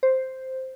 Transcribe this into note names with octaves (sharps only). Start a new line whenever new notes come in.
C5